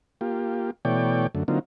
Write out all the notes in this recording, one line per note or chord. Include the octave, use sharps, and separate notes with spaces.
A#3 F4 G4
B2 E3 A3 C#5 D5 G5
F#2 D3 A3
D3 F#3 A#3 C4 D#4 F4